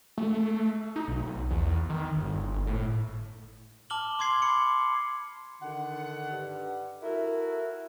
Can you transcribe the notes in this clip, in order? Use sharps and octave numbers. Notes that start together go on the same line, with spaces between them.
A3
D#4
B1
E2
D#3
G1
A2
A5 D6 F6 F#7 G7
C6 D6 G#6 C7
B5 C6 C#7
D3 D#3 F#5
G2
E4 F#4 A4 A#4